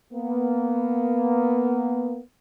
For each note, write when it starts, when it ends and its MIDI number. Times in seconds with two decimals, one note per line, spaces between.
0.14 2.19 58
0.14 2.19 59